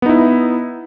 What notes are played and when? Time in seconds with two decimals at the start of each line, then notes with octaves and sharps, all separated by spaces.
0.02 B3
0.06 D#4
0.09 E4